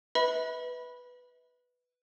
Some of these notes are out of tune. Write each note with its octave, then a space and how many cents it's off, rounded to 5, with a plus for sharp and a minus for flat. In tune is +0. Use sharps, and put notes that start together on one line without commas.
B4 +0 E5 -45 B5 -10